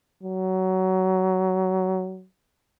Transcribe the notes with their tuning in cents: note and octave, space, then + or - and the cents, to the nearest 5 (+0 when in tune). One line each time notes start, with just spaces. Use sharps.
F#3 +20